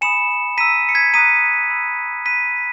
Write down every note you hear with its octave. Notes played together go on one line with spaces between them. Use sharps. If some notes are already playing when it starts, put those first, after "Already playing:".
G#5 B5 D#6 C#7 E7
A#5 E6 B6 D#7
C#7
G#6 B6
A#5 D#6 F#6 B6 D#7
B5 E6
B5 D#6 F#6 B6 D#7